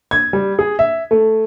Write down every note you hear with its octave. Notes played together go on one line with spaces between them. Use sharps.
G#6
G3
G#4
E5
A3